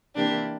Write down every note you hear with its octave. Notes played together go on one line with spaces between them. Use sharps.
C3 E3 A#3 D4 G4